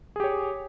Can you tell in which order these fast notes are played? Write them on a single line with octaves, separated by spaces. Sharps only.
G#4 G4 C#5